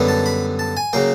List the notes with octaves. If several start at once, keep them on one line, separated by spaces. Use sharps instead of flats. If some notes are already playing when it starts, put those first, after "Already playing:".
Already playing: F#2 D3 G3 B3
A5
B5
A5
G#5
C#3 F#3 A#3 G5